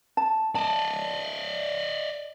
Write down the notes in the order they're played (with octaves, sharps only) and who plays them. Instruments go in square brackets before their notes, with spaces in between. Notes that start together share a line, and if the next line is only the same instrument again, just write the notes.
[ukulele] A5
[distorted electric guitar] D5 D#5 [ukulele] A5